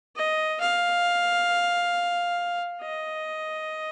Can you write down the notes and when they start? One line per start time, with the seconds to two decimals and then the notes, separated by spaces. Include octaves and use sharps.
0.16 D#5
0.60 F5
2.82 D#5